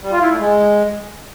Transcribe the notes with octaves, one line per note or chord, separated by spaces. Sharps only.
G3
F4
E4
A3
G#3